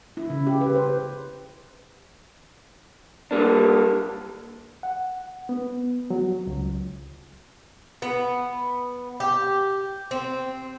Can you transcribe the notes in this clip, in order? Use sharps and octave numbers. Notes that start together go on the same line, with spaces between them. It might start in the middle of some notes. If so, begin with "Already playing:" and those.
E4
C#3
G4
B4
C5
G3 A#3 D4
F#5
B3
F#3
C#2
B3
G4
C4